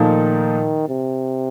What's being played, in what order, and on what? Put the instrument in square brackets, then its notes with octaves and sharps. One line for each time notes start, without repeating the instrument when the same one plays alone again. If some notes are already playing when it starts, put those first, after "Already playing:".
Already playing: [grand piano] A#2 F3 A3 D#4 [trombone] D#3
[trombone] C3